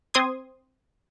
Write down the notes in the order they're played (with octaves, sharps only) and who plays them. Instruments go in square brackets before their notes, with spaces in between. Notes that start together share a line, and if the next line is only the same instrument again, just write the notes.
[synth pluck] C4 C6 D#6 G#6